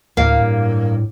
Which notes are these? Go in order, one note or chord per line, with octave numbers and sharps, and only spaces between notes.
D1 D2 A2 A#3 F5
G2